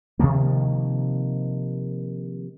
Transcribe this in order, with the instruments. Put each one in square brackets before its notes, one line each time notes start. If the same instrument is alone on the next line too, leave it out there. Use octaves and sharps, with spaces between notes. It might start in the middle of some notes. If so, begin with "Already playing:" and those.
[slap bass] C3 D#3 F3 A#3